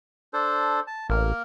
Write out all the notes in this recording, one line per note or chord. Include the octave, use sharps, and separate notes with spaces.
D4 A4 C5
A5
A1 A#3 A#4